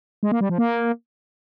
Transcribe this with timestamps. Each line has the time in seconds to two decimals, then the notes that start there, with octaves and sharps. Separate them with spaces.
0.23 G#3
0.32 A#3
0.41 G3
0.49 F3
0.58 A#3